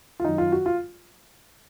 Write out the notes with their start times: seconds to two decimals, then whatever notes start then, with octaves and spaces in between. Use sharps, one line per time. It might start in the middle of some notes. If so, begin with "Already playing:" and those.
0.20 F4
0.24 F#2 D#3 D#4
0.38 F4
0.52 F#4
0.66 F4